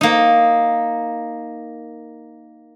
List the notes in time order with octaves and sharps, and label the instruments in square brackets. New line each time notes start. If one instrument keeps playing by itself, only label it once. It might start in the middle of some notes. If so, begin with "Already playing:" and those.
[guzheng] A#3 D#4